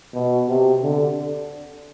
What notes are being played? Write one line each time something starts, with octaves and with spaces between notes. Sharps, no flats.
B2
C3
D3